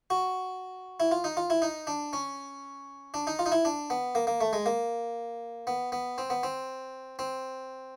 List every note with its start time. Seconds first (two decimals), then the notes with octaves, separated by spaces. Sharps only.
0.10 F#4
1.00 E4
1.11 F4
1.24 D#4
1.37 F4
1.50 E4
1.62 D#4
1.87 D4
2.13 C#4
3.14 D4
3.27 D#4
3.39 F4
3.46 D#4
3.52 E4
3.65 D4
3.90 B3
4.15 A#3
4.27 A#3
4.41 A3
4.53 G#3
4.66 A#3
5.67 B3
5.92 B3
6.18 C4
6.30 B3
6.43 C4
7.19 C4